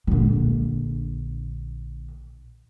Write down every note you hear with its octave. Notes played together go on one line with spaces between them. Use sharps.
A#1 D3